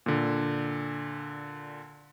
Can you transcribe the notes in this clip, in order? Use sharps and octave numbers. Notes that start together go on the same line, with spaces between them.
A#2 D3